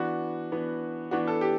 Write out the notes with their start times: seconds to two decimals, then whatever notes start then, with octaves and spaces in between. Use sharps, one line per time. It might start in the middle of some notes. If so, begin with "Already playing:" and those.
Already playing: E3 B3 D4 F#4
0.52 E3 B3 D4
1.11 E3 B3 D4 F#4
1.27 A4
1.41 G4